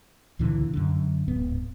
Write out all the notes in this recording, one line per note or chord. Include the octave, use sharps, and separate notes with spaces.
C#2 A#2 D3 E3
F#2 D3
D1 G#2 B3